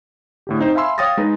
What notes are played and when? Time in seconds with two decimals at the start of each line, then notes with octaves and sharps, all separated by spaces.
0.47 A2 D3 G4
0.59 C4 D#4 C5
0.75 E5 F5 G#5 B5 C6 E6
0.98 C#5 F5 G5 D#6 A6 A#6
1.17 G#3 D#4 B4